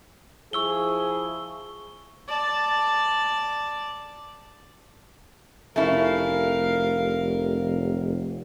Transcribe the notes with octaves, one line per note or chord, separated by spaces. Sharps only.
F3 E4 G#4 C#6 E6 G7
D5 A5
F1 A3 C#4 E4 A#4 F5